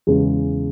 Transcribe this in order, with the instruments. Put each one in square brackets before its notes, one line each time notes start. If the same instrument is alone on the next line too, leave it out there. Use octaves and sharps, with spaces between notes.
[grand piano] E2 C#3 G#3 G#4